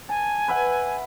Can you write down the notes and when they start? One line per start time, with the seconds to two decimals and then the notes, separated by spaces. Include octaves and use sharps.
0.09 G#5 A5
0.48 B4 E5 F#5